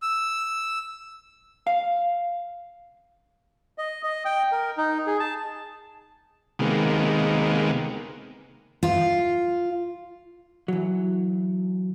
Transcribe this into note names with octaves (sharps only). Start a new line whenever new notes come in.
E6
F5
D#5
D#5
G5
A#4
D#4
G#4
A5
C3 D#3 G#3 A#3 B3
F4
E3 F#3